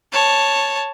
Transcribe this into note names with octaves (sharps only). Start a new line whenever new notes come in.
C#5 A5